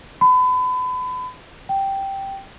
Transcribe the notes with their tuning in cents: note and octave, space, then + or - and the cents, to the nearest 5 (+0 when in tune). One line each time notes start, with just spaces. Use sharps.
B5 +35
G5 -5